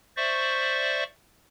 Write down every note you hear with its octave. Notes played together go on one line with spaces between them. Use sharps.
C5 D5 E5 C#6